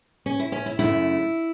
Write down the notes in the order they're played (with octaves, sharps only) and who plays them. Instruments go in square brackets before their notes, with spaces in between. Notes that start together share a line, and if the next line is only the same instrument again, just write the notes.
[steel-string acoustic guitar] C#4
E4
C#4
E4
F#2 C#3 A3 E4